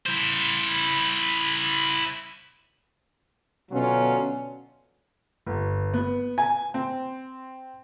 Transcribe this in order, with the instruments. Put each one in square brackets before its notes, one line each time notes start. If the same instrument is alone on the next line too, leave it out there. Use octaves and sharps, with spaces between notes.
[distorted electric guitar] E4 C5
[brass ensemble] B2 D3 F#3 C#4 D4 F4
[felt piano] G1
B3
G#5
C4